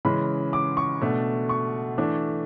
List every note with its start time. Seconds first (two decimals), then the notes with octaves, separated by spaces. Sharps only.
0.05 C#3 E3 G#3 C#4 B5
0.53 D6
0.77 C#6
1.01 B2 A3 D4
1.49 C#6
1.98 E3 A3 D4